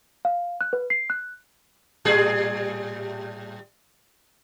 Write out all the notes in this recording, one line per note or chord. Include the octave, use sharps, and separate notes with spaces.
F5
F#6
B4
C7
F#6
A2 G3 G#4